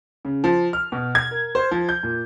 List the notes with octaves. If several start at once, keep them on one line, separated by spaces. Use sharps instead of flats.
C#3
F3
F6
B2
G#6
A#4
C5
F3
G6
A#2